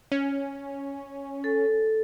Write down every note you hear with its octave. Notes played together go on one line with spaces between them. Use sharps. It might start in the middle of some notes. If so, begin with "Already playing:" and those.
C#4
A4